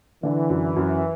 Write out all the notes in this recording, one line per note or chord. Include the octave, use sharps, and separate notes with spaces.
D3 E3
F#2
F#2